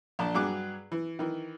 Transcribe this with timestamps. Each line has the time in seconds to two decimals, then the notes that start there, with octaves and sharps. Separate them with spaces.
0.19 A#1 D4 A5
0.34 G2 F#3 G#4 D6 F#6
0.92 E3
1.19 D#3 E3